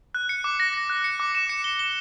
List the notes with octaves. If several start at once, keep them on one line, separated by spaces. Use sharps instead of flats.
F#6
C#7
D6
A#6
A#6
F#6
C#7
D6
E7
C#7
G7
G7